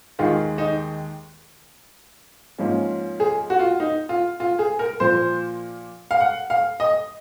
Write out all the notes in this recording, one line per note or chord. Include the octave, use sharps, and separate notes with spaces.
D#2 D#3 G#3 F4
D#4
G#2 F3 A#3 C#4
G#4
F#4
F4
D#4
F4
F4
G#4
A#4
A#2 F3 A#3 C5
F5
F#5
F5
D#5